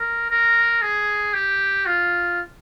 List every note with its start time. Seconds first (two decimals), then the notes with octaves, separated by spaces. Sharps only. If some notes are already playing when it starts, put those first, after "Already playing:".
Already playing: A#4
0.30 A#4
0.82 G#4
1.34 G4
1.86 F4